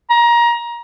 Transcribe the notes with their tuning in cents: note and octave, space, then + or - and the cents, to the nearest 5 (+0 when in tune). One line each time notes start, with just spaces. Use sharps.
A#5 +25